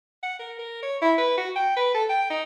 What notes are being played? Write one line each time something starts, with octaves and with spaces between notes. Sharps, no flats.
F#5
A#4
A#4
C#5
E4
B4
F#4
G5
B4
A4
G5
D#4